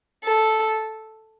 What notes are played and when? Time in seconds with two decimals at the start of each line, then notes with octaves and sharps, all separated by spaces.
0.25 A4